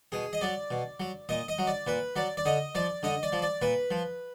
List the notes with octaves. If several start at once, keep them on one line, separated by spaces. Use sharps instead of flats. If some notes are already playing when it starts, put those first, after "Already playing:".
B2 G#4
D#5
F#3 D5
B2
F#3
A#2 D#5
D#5
F#3
D5
A#2 B4
F#3 D5
D5
D3 D#5
F3 D5
D3 D#5
D5
F3
D5
A#2 B4
F3